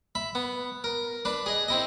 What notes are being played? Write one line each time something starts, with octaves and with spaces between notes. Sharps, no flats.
E5 B5
B3
A#4
D4 B4
G#4 D#5
C4 E4 D#5